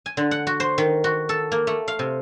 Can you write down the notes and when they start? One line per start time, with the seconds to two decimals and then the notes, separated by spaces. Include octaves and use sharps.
0.06 G#5
0.17 D3
0.31 F#5
0.47 F#4
0.60 C5
0.78 D#3
1.04 F#4
1.29 A4
1.52 A#3
1.67 A3
1.88 F5
1.99 C3